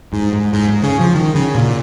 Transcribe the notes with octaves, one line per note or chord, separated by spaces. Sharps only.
G#2
G#2
G#2
G#2
C#3
F3
D#3
C#3
A#2